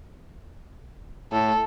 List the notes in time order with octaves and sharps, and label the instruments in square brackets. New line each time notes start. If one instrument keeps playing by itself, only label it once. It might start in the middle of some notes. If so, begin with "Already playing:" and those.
[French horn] A2 [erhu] A4